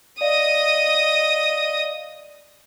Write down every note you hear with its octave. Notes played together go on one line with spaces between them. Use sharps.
D5 D#5 F5 D#6